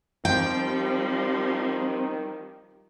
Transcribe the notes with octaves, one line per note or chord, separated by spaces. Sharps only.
D#3 F3 G3 C4 G5